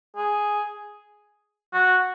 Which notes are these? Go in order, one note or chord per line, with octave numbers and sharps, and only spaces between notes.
G#4
F#4